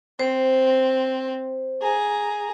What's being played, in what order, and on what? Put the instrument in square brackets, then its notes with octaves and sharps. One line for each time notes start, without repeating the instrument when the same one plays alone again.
[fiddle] C4 [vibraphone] C5
[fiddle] G#4 A#5